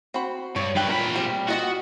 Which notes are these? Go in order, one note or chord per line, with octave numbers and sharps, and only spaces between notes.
C4 F#4 B5
G2 C#5
G2 B4 G5 B5
A#2 A#4 B5
G3 C4 A#4
F4 F#4 D#5 F#5